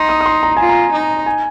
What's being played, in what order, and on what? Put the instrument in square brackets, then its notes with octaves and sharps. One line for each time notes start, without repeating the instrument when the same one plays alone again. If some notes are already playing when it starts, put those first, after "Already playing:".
Already playing: [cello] D#4 [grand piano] C6
[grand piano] D#6
D#6
C6
A#5
[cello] F4 [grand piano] G#5
[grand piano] A#5
[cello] D#4
[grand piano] G#5